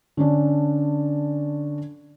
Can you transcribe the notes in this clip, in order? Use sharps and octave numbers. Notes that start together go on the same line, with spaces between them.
D3 C#4 D4